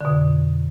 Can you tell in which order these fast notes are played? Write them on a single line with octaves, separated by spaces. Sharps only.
D3 B2 F2